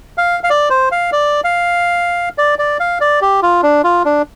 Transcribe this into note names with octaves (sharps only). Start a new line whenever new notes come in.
F5
F5
D5
C5
F5
D5
F5
D5
D5
F5
D5
G4
F4
D4
F4
D4